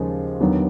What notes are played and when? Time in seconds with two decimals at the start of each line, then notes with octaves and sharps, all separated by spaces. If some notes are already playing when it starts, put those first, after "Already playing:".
Already playing: D#2 C#3 F3 G#3
0.41 D#2 D3 F#3 B3